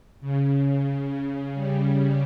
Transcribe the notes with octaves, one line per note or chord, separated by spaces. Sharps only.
C#3
G3